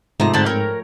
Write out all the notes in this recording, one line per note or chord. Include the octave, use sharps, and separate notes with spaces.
G#2 C3 F3 A3 D#4 A#5
D3 C4 C5 D5 A5 B5
A#4 C#5 G5